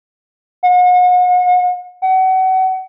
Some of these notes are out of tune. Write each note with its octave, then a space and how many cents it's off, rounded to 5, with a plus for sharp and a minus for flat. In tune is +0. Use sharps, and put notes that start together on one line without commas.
F#5 -40
F#5 +30